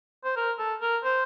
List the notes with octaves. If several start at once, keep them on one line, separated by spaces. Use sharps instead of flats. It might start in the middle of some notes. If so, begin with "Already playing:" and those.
C5
A#4
A4
A#4
C5